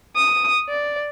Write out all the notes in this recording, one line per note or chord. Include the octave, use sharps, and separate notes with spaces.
D#6
D5